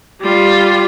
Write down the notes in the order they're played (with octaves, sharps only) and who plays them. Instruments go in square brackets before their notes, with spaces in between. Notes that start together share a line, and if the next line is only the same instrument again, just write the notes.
[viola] G3 F4